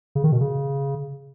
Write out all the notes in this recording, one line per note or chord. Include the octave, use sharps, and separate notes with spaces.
C#3
D#3
B2
C#3